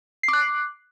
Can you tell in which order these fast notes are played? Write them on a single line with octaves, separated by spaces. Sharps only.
C7 D6 F#6